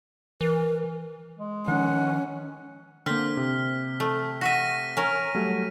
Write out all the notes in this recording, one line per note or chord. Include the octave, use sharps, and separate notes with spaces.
E3 A#4
G#3
D#3 F3 C#4 F#5
D3 A#3 C4 F6 B6
C3
A3
F#4 E5 A#6 B6 D#7
C#4 A#4
F#3 G3 A3